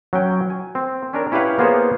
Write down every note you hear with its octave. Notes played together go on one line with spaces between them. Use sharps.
F#3 C#4 G5
G#5
C4
C#4 D4 A#4
C#4 E4 G4 B4 F5 F#5
A#3 B3 F4 G#4 C5 C#5